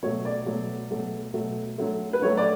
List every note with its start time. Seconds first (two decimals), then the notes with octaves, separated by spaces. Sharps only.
0.03 B2 F#3 A3 C#5
0.25 D5
0.46 B2 F#3 A3
0.90 B2 F#3 A3
1.34 B2 F#3 A3
1.78 D3 F#3 A3
2.13 B4
2.22 D3 F#3 A3 C#5
2.37 D5